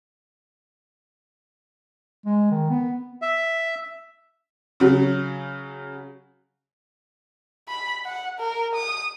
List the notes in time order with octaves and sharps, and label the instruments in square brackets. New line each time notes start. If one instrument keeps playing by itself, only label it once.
[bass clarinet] G#3
D#3
B3
[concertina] E5
[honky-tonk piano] C#3 F#3
[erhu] B5
F#5
A#4
D#6